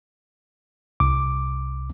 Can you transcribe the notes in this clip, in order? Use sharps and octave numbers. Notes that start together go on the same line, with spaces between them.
C2 D6